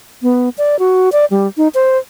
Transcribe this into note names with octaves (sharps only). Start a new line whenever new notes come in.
B3
D5
F#4
D5
G3
D#4
C5